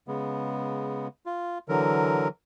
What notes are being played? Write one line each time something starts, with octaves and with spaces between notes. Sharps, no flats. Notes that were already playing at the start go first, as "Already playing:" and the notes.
C#3 G#3 B3
F4
D3 E3 F#3 A#4